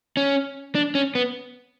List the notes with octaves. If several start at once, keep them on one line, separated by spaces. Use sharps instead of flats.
C#4
D4
C#4
B3